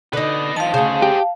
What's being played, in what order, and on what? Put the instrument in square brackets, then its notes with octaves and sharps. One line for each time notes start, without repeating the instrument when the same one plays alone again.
[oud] D3 D#4 [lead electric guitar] B4 D#5
[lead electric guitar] D#3 F3 [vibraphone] F5 A5
[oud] D2 C#3 [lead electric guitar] G#4 C5
[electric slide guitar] G4